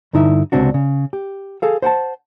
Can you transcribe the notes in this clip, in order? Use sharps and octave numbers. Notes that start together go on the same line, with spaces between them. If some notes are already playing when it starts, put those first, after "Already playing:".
G2 D3 D#4 E4 E5
C#2 G2 C3 C4 D4 F#4
C#3
G4
G#4 A4 F5
C5 F#5 G5 A5